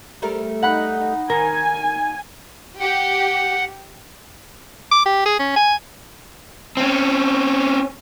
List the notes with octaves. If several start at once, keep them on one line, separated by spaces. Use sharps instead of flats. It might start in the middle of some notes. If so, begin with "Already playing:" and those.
G3 A3 A#4
D#4 F#5 B5 F#6
D#3 A#4 G#5
G4 F#5
D6
G4
G#4
C#4
G#5
C4 C#4